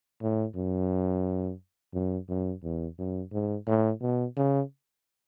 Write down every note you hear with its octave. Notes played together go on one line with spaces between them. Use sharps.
A2
F#2
F#2
F#2
E2
F#2
G#2
A2
B2
C#3